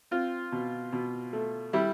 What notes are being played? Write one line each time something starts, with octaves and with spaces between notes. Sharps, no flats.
C4 F4
B2
B2
A3
G3 E4